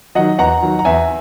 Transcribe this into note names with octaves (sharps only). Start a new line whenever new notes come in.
D#3 F#3 D#5 F#5
E2 F#5 A#5
D#3 F#3
A#5
E2 E5 G#5